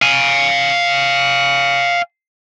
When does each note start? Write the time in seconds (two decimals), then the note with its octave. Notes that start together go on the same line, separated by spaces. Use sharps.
0.02 F5 G#5